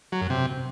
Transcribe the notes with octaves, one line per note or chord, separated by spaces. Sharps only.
F#3
F#2
C3